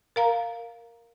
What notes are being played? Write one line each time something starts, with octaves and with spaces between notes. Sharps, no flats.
A#4 F5 A#5